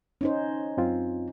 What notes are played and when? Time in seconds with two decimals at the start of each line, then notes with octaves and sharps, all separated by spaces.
0.21 C#4 D#4 C5
0.77 F#2 C4 F4